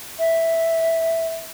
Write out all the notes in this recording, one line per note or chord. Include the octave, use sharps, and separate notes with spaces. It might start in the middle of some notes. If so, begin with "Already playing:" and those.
E5